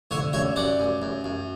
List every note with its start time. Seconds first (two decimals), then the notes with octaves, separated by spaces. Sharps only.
0.11 D3 C#5 E5
0.33 F#2 C#5 E5
0.56 F#2 D5 F#5
0.80 F#2
1.02 F#2
1.24 F#2